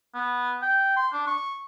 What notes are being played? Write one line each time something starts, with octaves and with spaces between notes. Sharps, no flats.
B3
G5
C6
D4
C#6